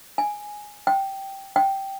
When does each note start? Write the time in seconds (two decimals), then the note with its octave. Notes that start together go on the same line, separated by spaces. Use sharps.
0.18 G#5
0.87 G5
1.56 G5